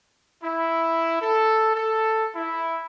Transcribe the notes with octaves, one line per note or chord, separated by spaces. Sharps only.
E4
A4
A4
E4